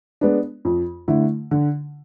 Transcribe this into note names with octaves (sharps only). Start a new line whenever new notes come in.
G#3 B3 D4
F2
D3 A3 E4
D3